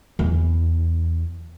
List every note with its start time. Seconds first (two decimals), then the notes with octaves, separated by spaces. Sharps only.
0.19 E2